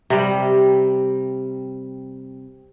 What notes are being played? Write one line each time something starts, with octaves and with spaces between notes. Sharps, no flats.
C3 G3